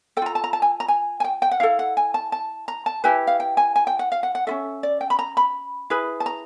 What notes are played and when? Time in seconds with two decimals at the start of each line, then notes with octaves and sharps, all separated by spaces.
0.17 A4 G5
0.22 F4 A#5
0.35 A5
0.44 A#5
0.53 A5
0.62 G#5
0.80 A#5
0.88 G#5
1.20 G#5
1.24 G5
1.42 G5
1.51 F#5
1.60 E4 A4 F5
1.79 F#5
1.97 G#5
2.14 A5
2.32 A5
2.68 A#5
2.86 A5
3.04 E4 G4 B4 G#5
3.27 F5
3.40 G5
3.57 G#5
3.76 G#5
3.87 G5
3.99 F#5
4.12 F5
4.23 F#5
4.35 F#5
4.47 C#4 F4 A4 E5
4.83 D5
5.01 G5
5.10 B5
5.19 A#5
5.37 B5
5.90 E4 G#4 B4
6.20 A5
6.26 A#5